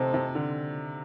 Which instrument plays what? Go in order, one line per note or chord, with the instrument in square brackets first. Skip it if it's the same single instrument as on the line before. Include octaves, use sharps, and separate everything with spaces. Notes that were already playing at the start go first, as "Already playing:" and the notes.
Already playing: [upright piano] C3 [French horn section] A3 C4 D#4 A4 C5
[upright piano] C3
D3